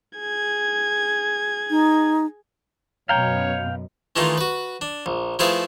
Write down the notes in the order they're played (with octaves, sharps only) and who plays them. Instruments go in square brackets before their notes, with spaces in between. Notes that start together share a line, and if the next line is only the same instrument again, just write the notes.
[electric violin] G#4 G#6
[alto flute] D#4
[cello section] F#2 B2 [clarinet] C#5 [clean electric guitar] F5 G5 [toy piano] A#5
[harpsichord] D#3 E3 G#3 A3 D#4 F4
F#4 B4
D4
A#1
F3 A3 E4 G#4 B4 F5